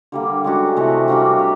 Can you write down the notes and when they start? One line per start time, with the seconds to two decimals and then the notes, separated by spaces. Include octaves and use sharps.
0.12 D3 G3 A#3
0.44 G#3 C#4 F#4 A4
0.76 C3 E3 A3
1.08 G3 A#3 D4 F#4
1.39 G4